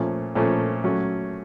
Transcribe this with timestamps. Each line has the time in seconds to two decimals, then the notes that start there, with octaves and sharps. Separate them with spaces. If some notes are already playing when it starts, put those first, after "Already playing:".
Already playing: A#2 F3 A3 C#4
0.35 A#2 F3 A3 C#4
0.84 F#3 A3 C#4